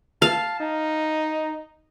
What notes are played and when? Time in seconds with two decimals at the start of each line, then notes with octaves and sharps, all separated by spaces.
0.22 F5 A5
0.60 D#4